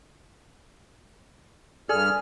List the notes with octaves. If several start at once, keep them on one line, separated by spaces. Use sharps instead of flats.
G2 G#4 A4 D5 F6